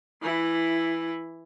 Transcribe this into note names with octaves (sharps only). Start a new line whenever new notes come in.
E3 E4